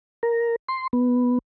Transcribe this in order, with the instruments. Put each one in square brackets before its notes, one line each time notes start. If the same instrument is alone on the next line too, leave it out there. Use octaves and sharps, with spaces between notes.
[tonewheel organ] A#4
C6
B3